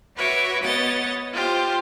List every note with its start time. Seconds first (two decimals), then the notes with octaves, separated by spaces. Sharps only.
0.15 F#4 B4 C#5 E5 D6
0.63 B3 C#5 D#5 A6
1.33 F4 G4 C5